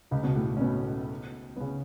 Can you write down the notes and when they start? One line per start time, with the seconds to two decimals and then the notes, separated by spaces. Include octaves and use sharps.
0.11 C#2 C#3
0.23 B2
0.36 A2
0.57 C#4
0.61 B2 B3
1.57 B3
1.60 C#3 C#4